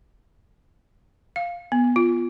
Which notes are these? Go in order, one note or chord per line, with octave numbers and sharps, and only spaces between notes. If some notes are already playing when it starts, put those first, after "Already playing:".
F5
B3
F4